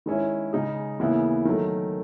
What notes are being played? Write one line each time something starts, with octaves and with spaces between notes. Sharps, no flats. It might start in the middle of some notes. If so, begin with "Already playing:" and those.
D#3 G#3 C#4 E4
C#3 G#3 D#4 G#4
D#2 C#3 E3 B3 E4
D#3 F#3 A3